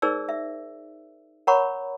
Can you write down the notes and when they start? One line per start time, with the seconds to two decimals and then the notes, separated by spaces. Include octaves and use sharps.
0.02 D#4 G#4 A#4 C5 D5 E6
0.29 E5
1.47 A#4 C#5 F#5 A#5 B5 C#6